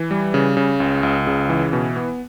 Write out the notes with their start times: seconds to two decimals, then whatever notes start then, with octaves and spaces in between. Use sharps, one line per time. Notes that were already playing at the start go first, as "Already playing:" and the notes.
Already playing: E3
0.11 G3
0.34 C#3
0.57 C#3
0.80 C#2
1.03 C#2
1.27 C#3
1.49 E3
1.73 B2
1.96 B3